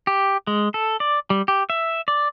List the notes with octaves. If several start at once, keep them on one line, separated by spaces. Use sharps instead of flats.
G4
G#3
A4
D5
G3
G4
E5
D5